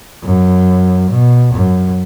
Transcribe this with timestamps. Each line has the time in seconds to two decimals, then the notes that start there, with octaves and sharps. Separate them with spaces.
0.24 F#2
1.11 B2
1.53 F#2